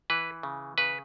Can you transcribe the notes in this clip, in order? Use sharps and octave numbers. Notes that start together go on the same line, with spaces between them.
E3 B4
C#3
C#3 B4